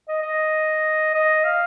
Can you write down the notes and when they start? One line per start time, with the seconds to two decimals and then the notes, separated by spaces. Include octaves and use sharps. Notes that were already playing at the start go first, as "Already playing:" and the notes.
0.08 D#5
0.22 D#5
1.14 D#5
1.44 F5